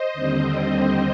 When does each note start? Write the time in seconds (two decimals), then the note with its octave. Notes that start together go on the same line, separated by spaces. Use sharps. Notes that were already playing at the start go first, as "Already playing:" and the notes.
Already playing: C5 D#5
0.14 D#2 D3 G3 C4
0.55 C5 D#5